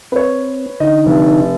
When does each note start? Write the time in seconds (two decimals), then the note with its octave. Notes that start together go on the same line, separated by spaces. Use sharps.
0.12 C4 B4 C#5
0.80 D3 D#4 D#5
1.06 F1